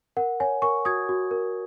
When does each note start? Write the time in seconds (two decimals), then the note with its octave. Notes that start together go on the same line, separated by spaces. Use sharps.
0.17 A#4 F#5
0.40 C#5 G#5
0.62 A#4 G#5 C#6
0.85 F#4 D#6 G#6
1.09 F#4
1.31 A#4